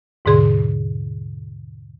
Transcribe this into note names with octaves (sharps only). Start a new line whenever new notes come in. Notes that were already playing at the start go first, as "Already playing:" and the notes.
D#2 G#2 B2 D3 G#4 C6